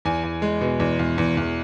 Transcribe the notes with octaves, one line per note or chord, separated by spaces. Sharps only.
E2 G#5
E2
G#3
B2
E2
E2
E2
E2